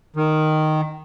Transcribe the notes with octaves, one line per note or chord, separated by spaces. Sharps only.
D#3